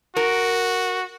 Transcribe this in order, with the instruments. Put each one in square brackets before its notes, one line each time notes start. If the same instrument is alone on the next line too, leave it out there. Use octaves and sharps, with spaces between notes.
[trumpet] F#4 [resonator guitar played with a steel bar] A#4